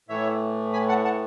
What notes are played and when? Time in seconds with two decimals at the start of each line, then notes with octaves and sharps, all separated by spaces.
0.09 A2 E3 A3 C#5 E5
0.73 G#5 B5
0.89 F#5 A5
1.05 F#5 A5